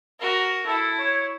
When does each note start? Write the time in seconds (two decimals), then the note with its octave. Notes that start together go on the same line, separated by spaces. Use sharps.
0.20 F#4 A#4
0.66 E4 A4
0.99 C#5